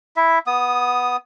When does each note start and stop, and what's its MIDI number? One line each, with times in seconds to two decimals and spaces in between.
0.16 0.39 64
0.16 0.39 76
0.47 1.17 59
0.47 1.17 87